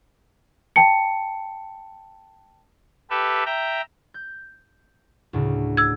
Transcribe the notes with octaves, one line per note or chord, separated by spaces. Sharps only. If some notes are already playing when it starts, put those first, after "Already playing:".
G5 A5 C#7
G4 A4 B4 E5
E5 G5 A#5
G6
D2 A2 C#3
E6 G#6